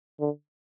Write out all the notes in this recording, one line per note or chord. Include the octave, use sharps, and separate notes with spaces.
D3